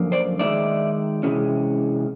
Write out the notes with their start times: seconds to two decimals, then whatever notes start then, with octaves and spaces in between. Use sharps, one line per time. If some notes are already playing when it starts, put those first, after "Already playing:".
Already playing: F#2 D3 F3 A#3
0.12 C5 D5
0.39 D#3 G#3 C4 D#4 D5 E5
1.23 C3 E3 G#3 C#4